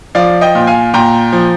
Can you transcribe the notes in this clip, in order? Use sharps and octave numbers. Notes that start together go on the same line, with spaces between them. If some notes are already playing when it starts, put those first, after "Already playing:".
F3 D5 F5
D#5 G5
A#2
F5 G#5
A#2 G5 A#5
F3